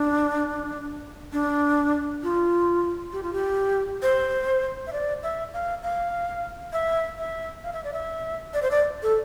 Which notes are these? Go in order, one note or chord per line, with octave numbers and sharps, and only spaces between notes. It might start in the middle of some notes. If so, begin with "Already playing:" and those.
Already playing: D4
D4
F4
G4
F4
G4
C5
E5
D5
E5
F5
F5
E5
E5
F5
E5
D5
E5
D5
C5
D5
A4